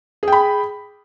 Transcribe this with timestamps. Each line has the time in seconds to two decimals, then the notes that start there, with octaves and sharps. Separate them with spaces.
0.23 G#4
0.28 G5
0.32 B5